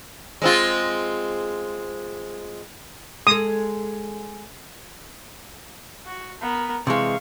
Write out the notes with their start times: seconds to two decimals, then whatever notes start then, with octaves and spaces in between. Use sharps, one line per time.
0.42 G#3 C4 F4
3.27 G#3 A4 D#6
6.06 F#4
6.42 B3 A#4
6.87 C3 E3 G#3 F5 C#6